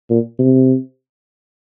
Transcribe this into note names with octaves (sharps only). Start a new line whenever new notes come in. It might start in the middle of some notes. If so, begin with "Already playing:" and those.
A#2
C3